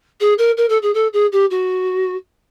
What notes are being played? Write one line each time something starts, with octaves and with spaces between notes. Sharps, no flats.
G#4
A#4
A#4
A4
G#4
A4
G#4
G4
F#4